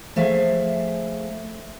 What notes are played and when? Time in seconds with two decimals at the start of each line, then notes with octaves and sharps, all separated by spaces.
0.16 F3 A3 G#4 E5 F5